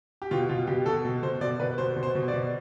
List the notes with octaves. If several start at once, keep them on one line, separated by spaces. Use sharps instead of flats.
G4
B2 F4
B2 F4
B2 G4
B2 A4
B2
B2 C5
B2 D5
B2 B4
B2 C5
B2
C5
B2
D5
B2